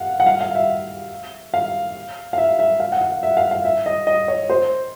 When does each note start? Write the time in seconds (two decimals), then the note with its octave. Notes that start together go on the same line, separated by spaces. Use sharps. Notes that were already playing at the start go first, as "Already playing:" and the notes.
Already playing: F5 F#5
0.20 F#5
0.26 F5
0.41 F5
0.55 E5
1.54 F5
2.33 F5
2.38 E5
2.59 E5
2.80 F5
2.92 F#5
3.01 F5
3.23 E5
3.37 F5
3.51 F5
3.65 E5
3.86 D#5
4.07 D#5
4.28 C#5
4.50 C5